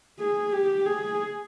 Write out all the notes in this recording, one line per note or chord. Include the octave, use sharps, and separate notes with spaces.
G#4
G4
G#4